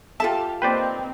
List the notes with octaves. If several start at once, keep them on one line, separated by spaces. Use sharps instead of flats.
F4 G4 A4 E5 F5 A5
A#3 C4 D#4 B4 C5 D5 G5